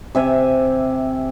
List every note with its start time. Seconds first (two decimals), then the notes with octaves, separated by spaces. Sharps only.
0.15 C3 E5 G#5